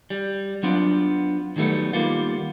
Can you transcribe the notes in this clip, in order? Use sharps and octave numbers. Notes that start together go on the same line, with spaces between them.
G3
F#3 B3 C4 D4 F4
D#3 F#3 G3 A3 B3
D#3 G3 A#3 B3 F4